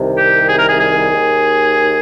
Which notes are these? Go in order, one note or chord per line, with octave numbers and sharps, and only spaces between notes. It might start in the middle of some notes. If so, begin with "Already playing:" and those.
Already playing: C2 C3 D#3
G4
G#4
A#4
G#4
G#4
D#2 D#3